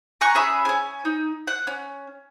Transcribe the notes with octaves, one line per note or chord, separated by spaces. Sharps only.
G#5 A#5 C#6 F#6
C#4 G#4 E5 B5
C#4 G#5
D#4
F#5
C#4